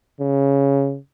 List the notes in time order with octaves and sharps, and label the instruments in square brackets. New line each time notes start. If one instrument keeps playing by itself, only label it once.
[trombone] C#3